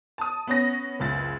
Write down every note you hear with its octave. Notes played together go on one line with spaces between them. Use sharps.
A5 D#6
B3 C#4 A#6
F#1 C#2 A6